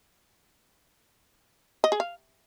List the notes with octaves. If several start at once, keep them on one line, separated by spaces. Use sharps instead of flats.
D#5
G#4
F5